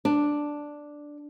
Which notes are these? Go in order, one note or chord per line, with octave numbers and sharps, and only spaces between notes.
D4